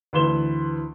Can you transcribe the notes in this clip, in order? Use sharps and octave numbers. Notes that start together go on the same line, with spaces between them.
D2 E3 B4 C6 E7 G7